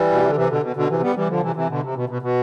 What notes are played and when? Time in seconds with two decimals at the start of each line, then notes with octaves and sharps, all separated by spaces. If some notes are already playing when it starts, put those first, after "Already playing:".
Already playing: E3 G3
0.12 B2
0.20 C3
0.28 D3
0.36 C3 E3
0.50 B2 D3
0.63 B2
0.76 B2 D3
0.89 C3 E3
1.03 G3 B3
1.16 E3 G3
1.29 D3 F3
1.43 C3 E3
1.55 C3 E3
1.69 B2 D3
1.83 C3
1.96 B2
2.09 B2
2.22 B2